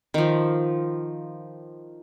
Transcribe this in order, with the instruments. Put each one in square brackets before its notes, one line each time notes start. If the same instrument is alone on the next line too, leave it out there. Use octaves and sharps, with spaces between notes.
[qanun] D#3 F3